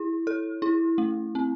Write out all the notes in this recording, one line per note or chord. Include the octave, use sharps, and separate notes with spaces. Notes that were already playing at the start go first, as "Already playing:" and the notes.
Already playing: E4
A4
E4
A3
C4